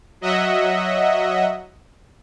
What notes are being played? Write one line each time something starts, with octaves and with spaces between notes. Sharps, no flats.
F#3 D#5 E5 F#5